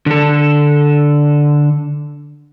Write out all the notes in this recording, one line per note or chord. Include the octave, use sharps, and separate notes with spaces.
D3 A4